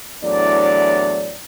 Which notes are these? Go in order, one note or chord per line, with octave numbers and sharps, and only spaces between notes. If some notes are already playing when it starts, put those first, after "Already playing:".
E2 A2 F#3 D4 D5